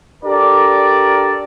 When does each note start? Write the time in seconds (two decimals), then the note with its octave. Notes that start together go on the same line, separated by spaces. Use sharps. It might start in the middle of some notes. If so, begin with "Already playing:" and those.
0.24 D4 G4 A4 A#4 D5